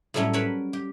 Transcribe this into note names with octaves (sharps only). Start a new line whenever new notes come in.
A2 F#3 G3 A3 C#4 C#5
A#4 B4 C#5 A5 B5
G4